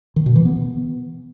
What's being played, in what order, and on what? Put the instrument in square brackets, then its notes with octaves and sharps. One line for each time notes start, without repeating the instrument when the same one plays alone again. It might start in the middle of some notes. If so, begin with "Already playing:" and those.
[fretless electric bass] D#3
B2
E3
B3